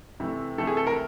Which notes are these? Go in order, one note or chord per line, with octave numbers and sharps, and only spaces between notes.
C3 E3 A3
C3 E3 A3 A4
G#4
A4
A#4